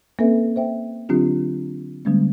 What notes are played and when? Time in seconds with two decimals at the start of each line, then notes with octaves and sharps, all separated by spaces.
0.19 A#3 C4 C#4 A4 B4 E5
0.56 C5 E5 G5
1.09 D3 F#3 C4 D4 F4 G4
2.05 D3 G3 G#3 A#3 B3 C#4